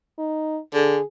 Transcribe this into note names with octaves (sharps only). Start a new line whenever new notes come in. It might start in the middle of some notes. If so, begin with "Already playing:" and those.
D#4
D3 G#4